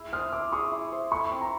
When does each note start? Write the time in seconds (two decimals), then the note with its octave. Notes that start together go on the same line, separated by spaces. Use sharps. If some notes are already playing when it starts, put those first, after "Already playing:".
Already playing: E4 G#4
0.13 C5 D#6 F6
0.32 E4 D6 E6
0.52 G#4 C#6 D#6
0.72 E4
0.92 C5
1.11 A3 B5 C#6
1.31 C4
1.41 A#5 C6